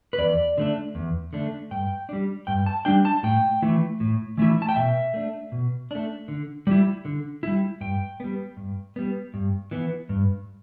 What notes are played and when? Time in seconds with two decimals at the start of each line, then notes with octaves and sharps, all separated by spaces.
0.13 B4
0.18 E2 D5
0.58 D3 A3 D4
0.95 E2
1.33 D3 A3 D4
1.71 G2 G5
2.09 G3 D4
2.47 G2 G5
2.66 A5
2.85 G3 D4 G5
3.05 A5
3.23 A2 G5
3.62 E3 A3 E4
4.00 A2
4.38 E3 A3 E4
4.62 A5
4.69 G5
4.76 B2 E5
5.14 A3 D4
5.52 B2
5.91 A3 D4
6.28 D3
6.67 G3 E4
7.05 D3
7.43 G3 E4
7.81 G2 G5
8.20 G3 B3
8.57 G2
8.96 G3 B3
9.34 G2
9.71 E3 B3
10.09 G2